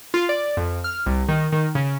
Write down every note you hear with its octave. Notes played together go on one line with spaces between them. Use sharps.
F4
D5
F2
F6
C2
D#3
D#3
C#3